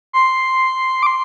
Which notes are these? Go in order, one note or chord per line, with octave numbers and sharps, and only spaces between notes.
C6
D6
C6